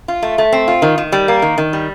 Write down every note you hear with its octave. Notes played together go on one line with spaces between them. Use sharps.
F4
A3
A3
C4
F4
D#3
D#3
G3
A#3
D#3
D#3
G3